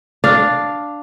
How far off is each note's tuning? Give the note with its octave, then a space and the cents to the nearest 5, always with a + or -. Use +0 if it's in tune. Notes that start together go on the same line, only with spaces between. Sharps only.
D4 +0 F5 +0